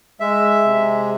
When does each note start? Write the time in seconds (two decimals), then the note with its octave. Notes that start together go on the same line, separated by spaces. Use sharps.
0.20 G#3 E5
0.65 C3